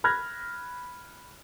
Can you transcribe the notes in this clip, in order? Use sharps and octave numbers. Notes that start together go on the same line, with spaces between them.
B5 F6 F#6 G#6 A#6